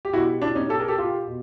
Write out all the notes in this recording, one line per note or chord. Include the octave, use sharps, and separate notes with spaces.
G4
B2 G3 E4 F#4
D4 E4
C#4 D#4
G4 A4
G#4 A#4
G4 A4
F4 G4
B2